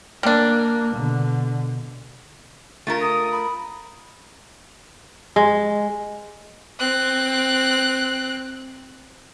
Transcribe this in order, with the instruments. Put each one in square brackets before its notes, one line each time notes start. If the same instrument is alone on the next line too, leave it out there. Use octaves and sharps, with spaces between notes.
[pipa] G3 D4 [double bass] A#3
[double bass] B2 D3
[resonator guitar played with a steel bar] A3 F4 A#4
[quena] D#6
B5
[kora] G#3
[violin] C4 F#6